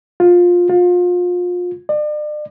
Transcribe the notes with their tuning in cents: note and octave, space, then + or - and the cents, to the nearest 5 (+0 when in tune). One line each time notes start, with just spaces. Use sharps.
F4 +15
F4 +30
D5 +40